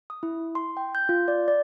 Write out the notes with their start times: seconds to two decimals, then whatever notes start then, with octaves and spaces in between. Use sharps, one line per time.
0.10 D#6
0.23 E4
0.55 C6
0.77 G5
0.95 G6
1.09 F4
1.28 D5
1.48 D5